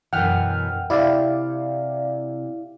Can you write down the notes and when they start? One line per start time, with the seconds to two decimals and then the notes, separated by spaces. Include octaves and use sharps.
0.13 F#2 B2 E3 F#5 G5 F6
0.90 C3 E4 D5 F5